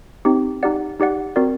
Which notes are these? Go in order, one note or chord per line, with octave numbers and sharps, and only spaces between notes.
C4 D#4 G4
D#4 G4 D5 F#5
D#4 G4 D5 F#5
C4 F#4 A#4 D5